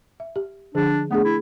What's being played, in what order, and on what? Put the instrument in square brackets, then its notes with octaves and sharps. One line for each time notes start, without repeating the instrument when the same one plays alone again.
[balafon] E5
G4
[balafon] D3 F3 G#4 [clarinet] D4
[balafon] A3 D4 G#4 [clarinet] B3
[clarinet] E4